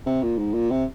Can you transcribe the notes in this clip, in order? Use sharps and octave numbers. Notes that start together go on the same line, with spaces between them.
C3
A#2
G#2
A#2
C3